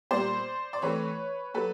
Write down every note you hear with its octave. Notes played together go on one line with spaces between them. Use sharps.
A#2 G3 A#3 C5 D5
D5
E3 A3 C4 B4 C#5
F#3 A#3 A4 B4